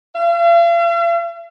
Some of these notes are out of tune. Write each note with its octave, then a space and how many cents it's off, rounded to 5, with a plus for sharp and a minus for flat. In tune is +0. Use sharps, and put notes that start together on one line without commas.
F5 -45